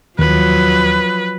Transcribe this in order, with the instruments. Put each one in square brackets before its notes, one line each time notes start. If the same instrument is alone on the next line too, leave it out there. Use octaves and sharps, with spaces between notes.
[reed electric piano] D#2 [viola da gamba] F3 F#3 [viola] B4